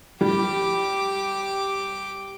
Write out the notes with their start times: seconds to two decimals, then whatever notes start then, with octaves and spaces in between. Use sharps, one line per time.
0.21 G3 G4 D6